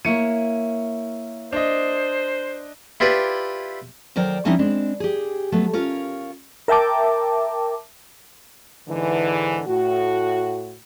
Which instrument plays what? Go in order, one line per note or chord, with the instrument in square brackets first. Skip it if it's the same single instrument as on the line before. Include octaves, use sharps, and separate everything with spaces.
[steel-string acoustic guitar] A#3 E4 C#5 [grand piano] C#7 D#7
[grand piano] D4 D#5 [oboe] C5
[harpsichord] E4 F4 G4 B4 D5
[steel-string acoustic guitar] D#2 F#3 A#4 C5 D5 G5
F3 G3 C4 C#4 D#4 E4
G#3 C4 D4
G4 G#4
F#3 A3 B3
C#4 F4 A#4 C#5
[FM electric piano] A#4 E5 G5 A5 D6
[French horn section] G#2 D3 E3
A2 F#4